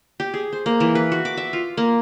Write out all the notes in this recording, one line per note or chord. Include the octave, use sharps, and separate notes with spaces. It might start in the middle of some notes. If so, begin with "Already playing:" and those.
G4
G#4
C5
A#3
E3
B4
F#4
D6
E5
F4
A#3